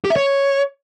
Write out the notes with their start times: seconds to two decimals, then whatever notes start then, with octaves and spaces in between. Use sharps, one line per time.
0.05 G4
0.10 E5
0.16 C#5